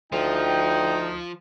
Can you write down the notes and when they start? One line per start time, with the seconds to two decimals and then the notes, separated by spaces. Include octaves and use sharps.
0.12 D2 F3 D#4 G5